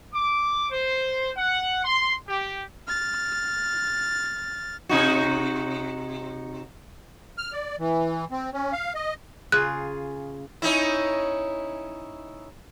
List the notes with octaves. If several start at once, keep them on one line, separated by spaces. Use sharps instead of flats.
D6
C5
F#5
C6
G4
F6 A6
C3 D#4 F#4
F6
D5
E3
C4
C#4
F5
D#5
C#3 F4 G#4 F#6
C#4 D#4 E4